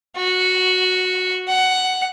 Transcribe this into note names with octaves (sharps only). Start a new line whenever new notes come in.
F#4
F#5